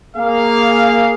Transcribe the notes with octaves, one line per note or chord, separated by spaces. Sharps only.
A#3 G#4 F5